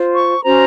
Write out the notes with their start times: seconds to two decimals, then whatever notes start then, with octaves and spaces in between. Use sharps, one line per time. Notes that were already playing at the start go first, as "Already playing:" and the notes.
Already playing: F4 C5
0.16 C#6
0.44 C#4 F#4 C5 A#5